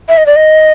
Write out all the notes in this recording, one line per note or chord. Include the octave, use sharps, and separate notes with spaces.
E5
D#5
D5
D#5